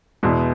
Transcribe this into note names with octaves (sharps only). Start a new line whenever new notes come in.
E2 B2 G#3 B3 E4